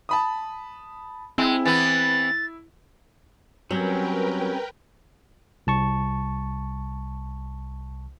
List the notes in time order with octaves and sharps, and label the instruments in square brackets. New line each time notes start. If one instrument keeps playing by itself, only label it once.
[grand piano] A5 B5 D#6
[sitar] G#3 [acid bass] C4 [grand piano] E4
[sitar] E3 B3 [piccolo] A6
[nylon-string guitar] F#3 [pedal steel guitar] G3 C4 C#4 [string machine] A#4 B4 G5
[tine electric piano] C2 A5 C#6